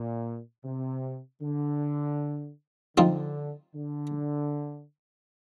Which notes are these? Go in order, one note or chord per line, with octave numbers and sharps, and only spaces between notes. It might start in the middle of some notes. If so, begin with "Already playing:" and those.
Already playing: A#2
C3
D3
D3 F3 C4 D#4
D3